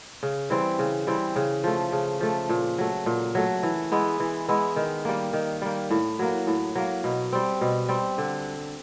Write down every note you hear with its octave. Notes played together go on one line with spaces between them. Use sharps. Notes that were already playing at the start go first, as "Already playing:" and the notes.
C#3
E3 G3 C4
C#3
E3 G3 C4
C#3
F3 A3
C#3
F3 A3
A#2
F#3 A3
A#2
F#3 A3
E3
G#3 B3 E4
E3
G#3 B3 E4
D#3
G3 A#3
D#3
G3 A#3
A2
F#3 A#3
A2
F#3 A#3
B2
G3 C4
B2
G3 C4
D3